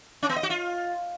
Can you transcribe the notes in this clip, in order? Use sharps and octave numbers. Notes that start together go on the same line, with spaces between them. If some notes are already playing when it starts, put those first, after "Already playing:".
C#4
B3
D#5
F#4
F4